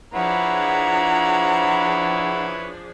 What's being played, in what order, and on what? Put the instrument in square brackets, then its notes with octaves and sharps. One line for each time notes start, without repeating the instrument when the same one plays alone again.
[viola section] F3 D4 G#4 [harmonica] E4 B4 C#5 [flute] F#5 [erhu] A#5